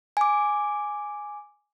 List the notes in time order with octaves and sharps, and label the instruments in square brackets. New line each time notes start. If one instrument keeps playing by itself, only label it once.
[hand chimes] G#5 D6